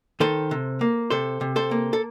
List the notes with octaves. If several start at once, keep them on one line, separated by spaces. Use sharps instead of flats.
D#3 A4 C5
C3
A#3
C3 A4 C5
C3
A4 C5
A#3
A4